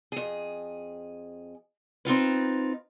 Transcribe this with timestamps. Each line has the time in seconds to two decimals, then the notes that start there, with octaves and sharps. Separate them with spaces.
0.12 F2 G#4
2.05 C4 D#4 F4 B4